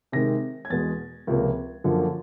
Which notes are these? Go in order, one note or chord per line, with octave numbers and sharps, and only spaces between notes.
C3 D#3 G#3 A#6
G#6
E2 B2 G#3 A6
C#2 C3 F3 A#3
F#2 D3 F3 A#3